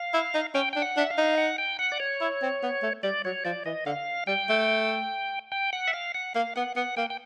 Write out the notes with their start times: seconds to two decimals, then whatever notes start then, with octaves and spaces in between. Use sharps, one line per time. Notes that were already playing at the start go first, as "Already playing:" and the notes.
Already playing: F5
0.13 E4
0.34 D#4
0.55 C#4 G5
0.73 D4 G5
0.82 F#5
0.97 D4 E5
1.10 F5
1.17 D#4
1.38 F#5
1.58 G5
1.79 F#5
1.92 D5
2.00 C#5
2.21 E4
2.42 C4
2.63 B3
2.82 A3
3.03 G3 D5
3.25 F#3 C#5
3.45 F3 D5
3.65 E3 D#5
3.86 D3 F5
4.27 G3 G5
4.49 A3
5.52 G5
5.73 F#5
5.88 E5
5.93 F5
6.14 F#5
6.35 A#3 F5
6.56 B3 F#5
6.76 B3 F#5
6.97 A#3 G5
7.10 G5